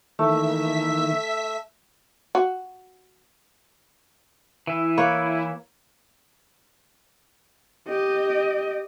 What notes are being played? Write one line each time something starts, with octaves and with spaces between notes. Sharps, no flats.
D#3 E3 A3 A#3 E5 B6
F#4
E3 E4 E5
A#3 B4 C#5
G4 D#5